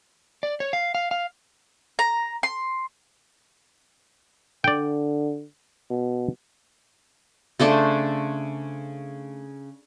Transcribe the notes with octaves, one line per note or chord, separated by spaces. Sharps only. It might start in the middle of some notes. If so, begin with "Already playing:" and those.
D5
C#5
F5
F5
F5
A#5
C6
D3 D5 G5
B2
C#3 A3 D4 C5